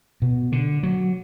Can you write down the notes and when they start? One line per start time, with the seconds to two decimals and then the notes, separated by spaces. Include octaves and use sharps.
0.22 B2
0.52 D3
0.83 F#3